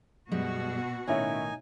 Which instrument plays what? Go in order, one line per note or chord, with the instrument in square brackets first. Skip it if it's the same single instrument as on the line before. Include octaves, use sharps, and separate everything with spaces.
[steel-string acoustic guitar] F#2 G3 G#3 [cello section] B2 F#4
[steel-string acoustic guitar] A2 D#3 [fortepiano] C#4 E4 C#5 [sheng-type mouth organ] D#4 G#5